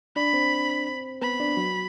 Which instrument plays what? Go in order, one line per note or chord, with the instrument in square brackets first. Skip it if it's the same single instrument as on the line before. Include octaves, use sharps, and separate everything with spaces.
[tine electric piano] D4 D5 [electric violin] B5
[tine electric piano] C4 C5
[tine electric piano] B3 B4 [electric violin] B5
[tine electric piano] D4 D5
F#3 F#4